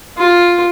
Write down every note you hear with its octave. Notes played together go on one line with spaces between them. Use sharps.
F4